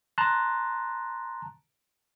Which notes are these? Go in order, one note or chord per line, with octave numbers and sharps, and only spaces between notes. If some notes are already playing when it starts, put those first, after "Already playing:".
A5 A#5 C6 F#6